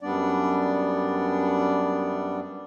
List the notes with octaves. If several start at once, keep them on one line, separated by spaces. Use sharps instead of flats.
F#2 G3 B3 D4 D5